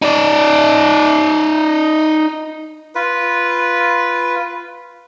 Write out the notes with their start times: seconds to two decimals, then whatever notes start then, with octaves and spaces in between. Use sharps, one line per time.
0.02 D#4 D5
2.95 F4 B4